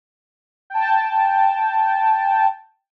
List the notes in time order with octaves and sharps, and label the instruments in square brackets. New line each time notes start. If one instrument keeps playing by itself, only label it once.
[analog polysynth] G5 A5